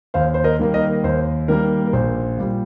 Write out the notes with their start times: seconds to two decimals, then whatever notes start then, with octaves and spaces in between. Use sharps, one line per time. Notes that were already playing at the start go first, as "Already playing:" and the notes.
0.14 D#2 C5 F5
0.34 C5
0.44 A#4 D#5
0.59 D#3 G3 A#3
0.74 A#4 D#5
1.04 D#2 C5
1.48 D#3 G3 A#3 A#4
1.87 A#4
1.93 A#1 C5
2.38 A#2 G3